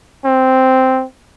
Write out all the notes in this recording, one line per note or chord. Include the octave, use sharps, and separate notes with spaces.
C4